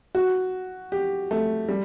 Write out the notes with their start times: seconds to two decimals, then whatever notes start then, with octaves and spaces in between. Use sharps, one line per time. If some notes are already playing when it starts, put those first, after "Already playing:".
0.15 F#4
0.92 G4
1.31 A3
1.69 G3